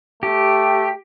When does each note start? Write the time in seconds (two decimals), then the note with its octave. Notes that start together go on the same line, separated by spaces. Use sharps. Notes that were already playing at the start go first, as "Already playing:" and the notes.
0.23 A3 G4